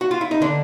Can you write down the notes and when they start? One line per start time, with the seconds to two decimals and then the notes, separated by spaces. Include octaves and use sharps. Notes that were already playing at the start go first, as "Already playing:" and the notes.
0.01 F#4
0.11 F4
0.21 E4
0.31 D#4
0.42 D3 D4